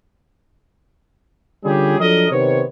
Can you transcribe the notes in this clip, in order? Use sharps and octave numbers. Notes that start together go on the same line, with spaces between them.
D3 G3 C#4 F4 G4 G#4
F3 F#3 D4 A4 A#4 D#5
C3 D#3 B3 C5 C#5